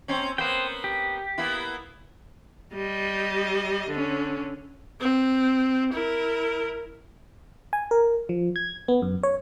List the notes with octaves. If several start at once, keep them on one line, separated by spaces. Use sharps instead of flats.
A#2 C4 C#4
A#3 B3 C5 G5
G4
A#3 B3 E4
G3 D#5
D3 C#4
C4
E4 A#4
G#5
A#4
F3
G#6
B3
F#2
C#5